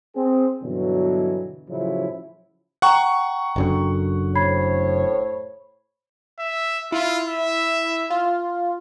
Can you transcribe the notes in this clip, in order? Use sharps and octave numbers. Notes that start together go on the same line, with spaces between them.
C4 G#4
G2 B2 D3 E3 F#3
A2 C#3 F3 F#3 C#4 E4
F#5 G5 A#5 C#6
F#1 F#2 D3
A2 C5 C#5 B5 G#6 C7
E5
E4 F4
E5
F4